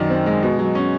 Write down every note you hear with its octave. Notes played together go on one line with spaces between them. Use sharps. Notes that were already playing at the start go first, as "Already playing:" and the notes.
Already playing: F#2 D#3 D5
C4
G#3
B2
F#3
C#4